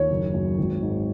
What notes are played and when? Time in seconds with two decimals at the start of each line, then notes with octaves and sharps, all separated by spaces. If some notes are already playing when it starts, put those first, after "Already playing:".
Already playing: D#2 C#5
0.10 F#1
0.34 F#2
0.58 G#1
0.82 G#2